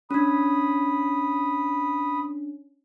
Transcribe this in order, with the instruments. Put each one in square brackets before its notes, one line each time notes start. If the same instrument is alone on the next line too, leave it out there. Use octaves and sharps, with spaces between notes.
[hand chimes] C#4 D4 [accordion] B5 D#6